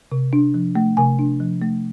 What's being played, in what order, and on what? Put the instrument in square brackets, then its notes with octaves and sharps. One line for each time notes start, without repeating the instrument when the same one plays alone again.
[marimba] C3
D4
F3
A3
C3 G#5
D4
F3
A3